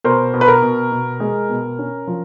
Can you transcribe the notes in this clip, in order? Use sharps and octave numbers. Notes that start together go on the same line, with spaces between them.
B2 A#4 C5
B2
B4
A#4
B2
B2
G#3
B2
C#4
F3